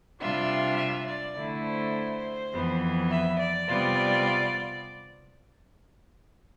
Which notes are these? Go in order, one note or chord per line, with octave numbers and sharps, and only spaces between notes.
C3 G3 D4 F4 E5
E5
D5
D3 A3 E4
C5
F2 E3 B3
E5
D5
C3 G3 B3 F4